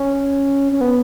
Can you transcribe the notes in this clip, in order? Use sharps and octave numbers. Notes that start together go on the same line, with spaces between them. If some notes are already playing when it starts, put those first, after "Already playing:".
Already playing: C#4
C#4
B3